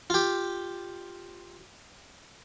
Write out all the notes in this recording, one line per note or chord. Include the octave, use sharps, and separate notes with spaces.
F4 G4